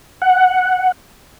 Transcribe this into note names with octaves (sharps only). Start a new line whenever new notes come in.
F#5